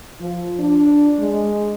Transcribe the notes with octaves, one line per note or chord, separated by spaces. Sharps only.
F3
D4
G#3